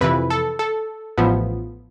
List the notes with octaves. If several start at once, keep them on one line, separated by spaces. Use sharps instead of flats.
F2 C3 E3 B4
A4
A4
A1 A2 F3 B3